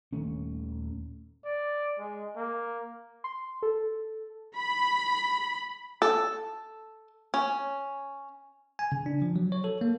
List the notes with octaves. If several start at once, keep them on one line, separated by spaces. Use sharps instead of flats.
D#1 D#2 A3 C#4
D5
G#3
A#3
C6
A4
B5
A4
C#4
G#5
C#3
D4
F3
F#3
C#5
A4
A#3